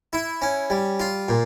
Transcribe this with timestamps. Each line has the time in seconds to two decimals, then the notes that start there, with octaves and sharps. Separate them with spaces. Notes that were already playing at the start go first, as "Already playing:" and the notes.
0.13 E4
0.42 C#4
0.70 G3
1.00 F4
1.28 A#2